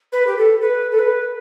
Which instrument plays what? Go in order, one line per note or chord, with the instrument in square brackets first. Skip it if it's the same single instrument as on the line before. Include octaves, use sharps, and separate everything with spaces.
[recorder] B4
G4
A4
B4
A4
B4